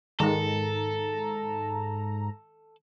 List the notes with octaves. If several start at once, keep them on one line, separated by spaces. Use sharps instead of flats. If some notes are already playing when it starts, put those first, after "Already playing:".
G#2 D#3 G#3 A4 A#5